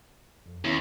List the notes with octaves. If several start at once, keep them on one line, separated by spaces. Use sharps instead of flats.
F2
D#2 B3 C#4 E4